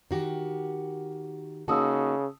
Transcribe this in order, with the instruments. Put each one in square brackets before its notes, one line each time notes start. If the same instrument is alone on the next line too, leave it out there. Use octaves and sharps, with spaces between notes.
[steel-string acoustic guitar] D#3 F#4 G4
[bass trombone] C#3 [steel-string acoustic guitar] A#3 D#4 F#4 [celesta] A5 D#6 E6